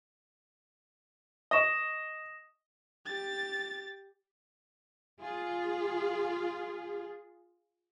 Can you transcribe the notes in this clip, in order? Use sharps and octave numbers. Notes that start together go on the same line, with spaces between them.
D#5 C#6 D#6 A#6 E7
G4 A6
F4 G#4